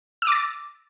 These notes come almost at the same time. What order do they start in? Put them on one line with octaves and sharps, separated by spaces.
E6 D6 A6